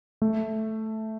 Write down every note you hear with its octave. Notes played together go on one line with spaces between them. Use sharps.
A3